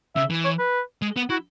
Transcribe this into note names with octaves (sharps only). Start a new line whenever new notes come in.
C#3 E5
E3
C#5
B4
G#3
B3
E4 F#4